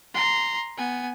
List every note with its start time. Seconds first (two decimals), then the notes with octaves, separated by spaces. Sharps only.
0.14 A#5 C6
0.78 B3 G#5